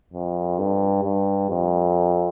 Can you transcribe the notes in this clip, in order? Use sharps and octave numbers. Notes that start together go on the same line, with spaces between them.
F2
G2
G2
F2